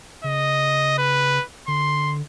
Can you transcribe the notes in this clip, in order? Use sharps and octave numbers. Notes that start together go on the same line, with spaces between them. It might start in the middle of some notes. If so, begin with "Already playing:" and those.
C#3 D#5
B4
D3 C6